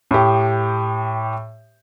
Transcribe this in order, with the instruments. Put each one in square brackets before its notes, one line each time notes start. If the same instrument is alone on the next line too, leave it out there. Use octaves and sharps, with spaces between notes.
[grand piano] A2 G4